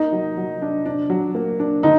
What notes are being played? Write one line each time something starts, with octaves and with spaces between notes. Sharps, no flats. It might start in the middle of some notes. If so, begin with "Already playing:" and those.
Already playing: A#3 D#4
F#3
F#3
D4
D4
F#3
A#3
D4
D3 D#4